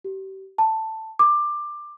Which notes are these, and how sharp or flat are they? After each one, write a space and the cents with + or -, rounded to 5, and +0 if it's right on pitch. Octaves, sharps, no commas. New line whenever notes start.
G4 -35
A5 +10
D6 +15